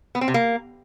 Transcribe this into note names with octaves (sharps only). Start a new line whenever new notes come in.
B3
C4
C3
A#3